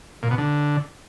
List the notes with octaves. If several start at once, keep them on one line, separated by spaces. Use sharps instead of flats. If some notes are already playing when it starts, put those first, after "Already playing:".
A#2
B2
D3